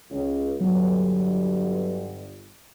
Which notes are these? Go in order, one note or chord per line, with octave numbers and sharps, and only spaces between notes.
C#2
G1 F#3